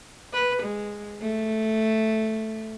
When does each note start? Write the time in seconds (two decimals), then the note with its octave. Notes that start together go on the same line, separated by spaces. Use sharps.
0.33 B4
0.63 G#3
1.22 A3